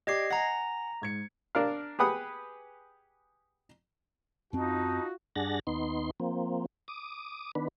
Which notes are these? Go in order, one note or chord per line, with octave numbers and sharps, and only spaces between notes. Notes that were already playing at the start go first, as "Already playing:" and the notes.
G4 D5 D#5 D6 G#6 C7
F#5 G#5 A#5 A#6
G#2 G#6 C#7
D4 A#4 F5
G4 G#4 B4 F#5 D#6
F#2 C4 D#4 F4 F#4 A5
G2 D4 G#4 F#5 A6 A#6
D#2 B3 D#4 C6
F3 A#3 C4
D6 D#6
D#3 B3 D4 B4